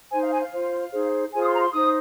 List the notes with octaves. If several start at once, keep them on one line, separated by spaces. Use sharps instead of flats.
D#4 C5 G#5
F5
G#5
F5
F4 C5
D#4 G#4 C5
F4 G#4 C5 G#5
D#6
C6
A#5
C6
D#4 C5 D#6